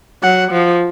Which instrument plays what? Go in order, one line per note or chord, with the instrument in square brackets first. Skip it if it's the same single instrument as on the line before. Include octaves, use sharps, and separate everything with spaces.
[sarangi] F#3 [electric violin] F#5
[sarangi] F3